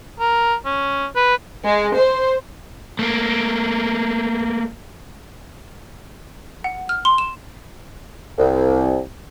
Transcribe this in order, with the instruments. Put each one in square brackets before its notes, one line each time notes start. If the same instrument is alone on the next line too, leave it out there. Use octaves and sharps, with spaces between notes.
[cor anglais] A#4
C#4
B4
[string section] G#3
C5
[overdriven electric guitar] A3 A#3
[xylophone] F#5
F6
C6
E7
[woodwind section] C2